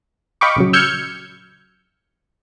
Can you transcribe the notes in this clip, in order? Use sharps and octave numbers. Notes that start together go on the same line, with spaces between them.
D#5 F5 G5 B5 C#6 D6
A#1 C#3 F#3
E6 F6 G6 G#6 C#7